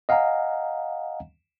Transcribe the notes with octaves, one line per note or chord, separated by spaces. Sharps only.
D#5 F5 F#5 G#5 A#5